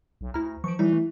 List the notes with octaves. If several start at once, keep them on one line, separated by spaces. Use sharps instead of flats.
B1
D2 E4 A#5 F6
E3 F3 C#6 D7
E3 F#3 G3 D#4 E4
A3